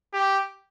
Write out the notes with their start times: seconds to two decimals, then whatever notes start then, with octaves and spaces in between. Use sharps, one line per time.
0.13 G4